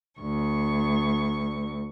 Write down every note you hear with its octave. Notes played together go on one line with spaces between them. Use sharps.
D2 C#6